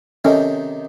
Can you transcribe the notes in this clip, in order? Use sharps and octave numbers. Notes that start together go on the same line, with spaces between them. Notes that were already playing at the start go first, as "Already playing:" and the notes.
C3 D#3 C#4 A4 D#5